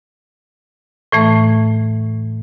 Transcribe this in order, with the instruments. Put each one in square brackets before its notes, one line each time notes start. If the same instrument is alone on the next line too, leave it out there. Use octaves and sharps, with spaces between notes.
[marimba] A2 E3 A3